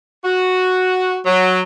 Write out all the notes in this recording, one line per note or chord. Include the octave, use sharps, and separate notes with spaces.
F#4
F#3